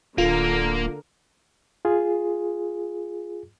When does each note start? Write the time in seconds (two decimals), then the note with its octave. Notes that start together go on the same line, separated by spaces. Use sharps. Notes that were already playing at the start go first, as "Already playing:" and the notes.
0.18 D1 D3 A#3 F4 A#4
1.85 F4 G#4